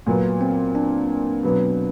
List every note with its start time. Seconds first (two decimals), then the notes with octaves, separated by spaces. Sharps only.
0.06 A#2 F#3 B3
0.41 C4
0.75 D4
1.43 B2 F#3 B3